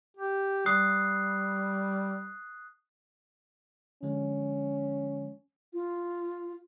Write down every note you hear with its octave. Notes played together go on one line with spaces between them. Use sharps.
G4
G3 D#6 F#6 C7
D3 F3 G#3 C#4
F4